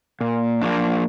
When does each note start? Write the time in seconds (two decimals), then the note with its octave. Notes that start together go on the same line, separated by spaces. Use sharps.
0.21 A#2
0.62 F3 A#3 D4